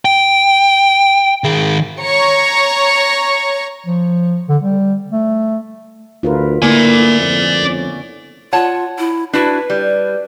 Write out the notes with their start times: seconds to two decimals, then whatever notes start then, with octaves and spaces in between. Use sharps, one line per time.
0.05 G5
1.44 D#3 G#4
2.03 C#5 A#5 C#6
3.86 F3
4.49 D3
4.62 G3
5.12 A3
6.23 D2 F4 A#4 B4
6.62 D3 A3 A#3 E4 D5 G#5
7.20 F2
7.63 B3 C#4
8.53 F4 C#5 F#5 A5
8.98 E4
9.33 D4 E4 F#4 B4
9.70 G3